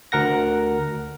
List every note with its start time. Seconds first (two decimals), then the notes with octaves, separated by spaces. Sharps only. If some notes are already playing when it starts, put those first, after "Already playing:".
0.12 D2 A#4 F#5 A#6